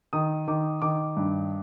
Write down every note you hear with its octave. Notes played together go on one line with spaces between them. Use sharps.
D#3 D#6
D#3 D6
D#3 D6
G2